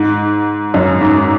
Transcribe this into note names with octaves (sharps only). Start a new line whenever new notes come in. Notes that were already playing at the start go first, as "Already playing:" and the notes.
Already playing: G#2
F#2
G#2